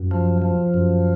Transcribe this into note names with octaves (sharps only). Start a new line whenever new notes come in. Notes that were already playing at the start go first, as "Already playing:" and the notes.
Already playing: F#2
F3
F3
F#2